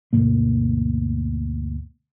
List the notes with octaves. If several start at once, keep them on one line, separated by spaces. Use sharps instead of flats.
D2 G2 B2 A#3